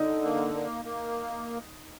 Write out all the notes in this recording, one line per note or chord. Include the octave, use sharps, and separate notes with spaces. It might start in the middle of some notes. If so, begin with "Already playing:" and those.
Already playing: D3 D#4
A#3
A#3
A#3